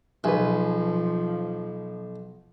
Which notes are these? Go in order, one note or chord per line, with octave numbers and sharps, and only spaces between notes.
B1 F3 G#4 B4